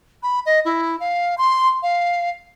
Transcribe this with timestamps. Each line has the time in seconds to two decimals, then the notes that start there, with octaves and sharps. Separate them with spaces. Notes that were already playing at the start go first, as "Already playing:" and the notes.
0.23 B5
0.46 D#5
0.65 E4
1.00 F5
1.38 C6
1.83 F5